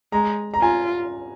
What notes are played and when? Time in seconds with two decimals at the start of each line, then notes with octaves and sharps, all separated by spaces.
0.12 G#3 A#5
0.54 A#5
0.61 F4 G#5